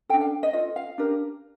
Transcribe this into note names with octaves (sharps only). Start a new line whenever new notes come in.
D4 A4 G5
F5
D#5
F4 A4 D#5
F5
D4 G4 A#4